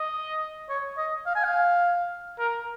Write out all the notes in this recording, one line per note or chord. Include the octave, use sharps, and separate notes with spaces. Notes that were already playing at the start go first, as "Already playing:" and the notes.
Already playing: D#5
C#5
D#5
F5
G#5
F5
A#4